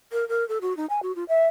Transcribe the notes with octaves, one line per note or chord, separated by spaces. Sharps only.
A#4
A#4
A4
F#4
D#4
G#5
F#4
F4
E5